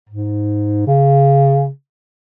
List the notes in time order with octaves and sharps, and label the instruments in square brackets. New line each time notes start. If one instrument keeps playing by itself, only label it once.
[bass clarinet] G#2
C#3